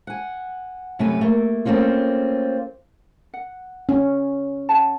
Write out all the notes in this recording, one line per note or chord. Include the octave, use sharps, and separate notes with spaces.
F#5 G#5
F#2 C3 A3 B3 B4 G#5
A3 A#3
A3 A#3 C4 C#4 F4
F#5
C#4
C#5 F#5 A5